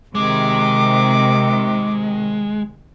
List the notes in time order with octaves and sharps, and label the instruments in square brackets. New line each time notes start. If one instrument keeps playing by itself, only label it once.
[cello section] C3 D#3 [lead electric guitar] G#3 [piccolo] D6